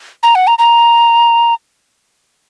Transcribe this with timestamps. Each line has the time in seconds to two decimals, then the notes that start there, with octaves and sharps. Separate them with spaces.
0.23 A#5
0.35 F#5
0.47 A#5
0.58 A#5